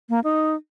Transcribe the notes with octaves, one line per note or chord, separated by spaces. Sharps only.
A#3
D#4